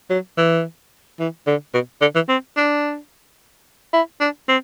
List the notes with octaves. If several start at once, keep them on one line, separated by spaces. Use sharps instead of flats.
F#3
E3
E3
D3
B2
D3
E3
C4
D4
E4
D4
C4